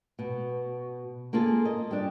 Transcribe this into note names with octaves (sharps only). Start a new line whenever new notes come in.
B2
A#3 F4 G#4 A4
D#5
G3 D4